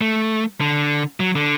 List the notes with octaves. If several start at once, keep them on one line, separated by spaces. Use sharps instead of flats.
A3
D3
F#3
D3